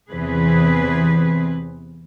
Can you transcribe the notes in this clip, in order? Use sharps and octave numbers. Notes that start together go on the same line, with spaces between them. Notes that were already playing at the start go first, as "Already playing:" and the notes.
E2 C3 E3 C4 G#4 B4